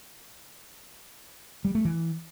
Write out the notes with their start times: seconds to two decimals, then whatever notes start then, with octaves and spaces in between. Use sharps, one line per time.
1.65 G3
1.75 A3
1.85 E3